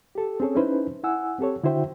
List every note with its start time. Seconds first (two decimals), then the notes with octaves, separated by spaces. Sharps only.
0.15 G4 A4
0.40 C4 C#4 G#4 A4 C#5
0.55 C#4 D#4 E4 B4 C5
1.04 E4 F#5 G#5 E6
1.39 C4 G4 A4 C#5
1.64 D3 E4 F#4 C5 E5 G5